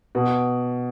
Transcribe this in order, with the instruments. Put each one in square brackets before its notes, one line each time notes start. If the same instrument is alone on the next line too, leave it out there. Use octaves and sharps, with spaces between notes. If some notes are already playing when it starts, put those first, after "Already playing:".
[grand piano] B2